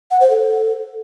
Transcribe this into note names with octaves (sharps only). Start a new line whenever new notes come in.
F#5
C5
A4